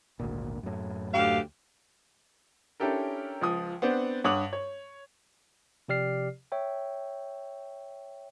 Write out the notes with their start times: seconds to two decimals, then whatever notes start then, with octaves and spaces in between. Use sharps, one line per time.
0.20 G#1 D2 A#2
0.63 F#2 A2
1.13 D2 G4 F5
2.80 C#4 D4 E4 G4 A4 A#4
3.41 C#2 F3 D#6
3.82 B3 C4 D4 C5 D5 F#5
4.24 G2 C#5 F#5 D6 D#6 F#7
4.53 C#5
5.88 C3 F3 G4 D5 F6 C7
6.52 C#5 E5 G5